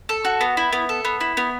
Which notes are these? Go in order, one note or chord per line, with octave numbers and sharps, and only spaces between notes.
A4
F#4
B3
E4
B3
A4
B3
E4
B3